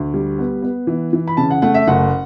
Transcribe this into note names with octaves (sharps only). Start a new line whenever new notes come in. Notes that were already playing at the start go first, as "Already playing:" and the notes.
Already playing: D2
G3
B3
B3
E3
E3
B5
C#3 A5
F#5
A3 F#5
E5
F#1 F#5